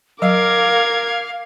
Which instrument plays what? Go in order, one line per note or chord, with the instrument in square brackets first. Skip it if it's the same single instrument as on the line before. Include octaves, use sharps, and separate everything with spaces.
[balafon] F#3 [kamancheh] A#4 [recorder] F5 [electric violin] D6 G#6